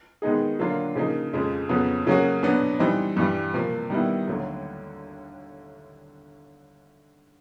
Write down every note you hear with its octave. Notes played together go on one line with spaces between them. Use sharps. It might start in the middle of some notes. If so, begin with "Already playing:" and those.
D#3 G#3 B3 D#4 G#4
D3 F#3 A#3 D4 F4
C#3 F3 A#3 D#4
F2 C#3 F3 G#3
F2 C#3 F#3 B3
C#3 F#3 A#3 C#4 F#4
B2 F#3 B3 D4
E3 G3 C4 D#4
G2 E3 G3
C3 F3 A#3
D#3 G3 B3 E4
D#2 D3 F#3 A3